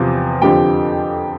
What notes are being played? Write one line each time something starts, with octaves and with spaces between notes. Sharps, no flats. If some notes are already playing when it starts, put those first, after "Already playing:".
Already playing: E2 C3 F3 F4
F2 D3 F3 G4 G5